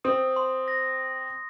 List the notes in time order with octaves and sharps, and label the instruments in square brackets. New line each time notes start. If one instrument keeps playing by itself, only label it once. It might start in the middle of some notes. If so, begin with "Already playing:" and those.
[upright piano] C4 [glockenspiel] D#6
[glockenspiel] C6
A#6